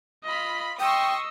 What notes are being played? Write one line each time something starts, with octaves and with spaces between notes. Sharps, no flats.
F4 D#5 B5
D#5 G5 C6 C#6 D#6 E6